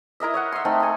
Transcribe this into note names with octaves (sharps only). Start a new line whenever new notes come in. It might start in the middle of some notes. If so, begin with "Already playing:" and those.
E4 A#4 D#5 E5
C#5 D#5 F#5
E5 C6
A3 C4 D#4 A4
A4 G#5